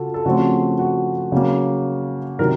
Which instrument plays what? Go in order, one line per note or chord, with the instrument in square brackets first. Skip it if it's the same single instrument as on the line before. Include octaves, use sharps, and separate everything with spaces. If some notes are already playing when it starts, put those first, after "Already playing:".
Already playing: [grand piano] C#3 F4 F#4 A4
A4
C#3 F3 A3 C4 F#4
F#4
C#3 F#3 A#3
C3 D#3 F#3 A#4